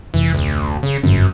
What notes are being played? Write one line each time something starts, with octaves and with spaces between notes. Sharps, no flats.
F1 E3
D2
C#3
G1 F#2 D3 C#4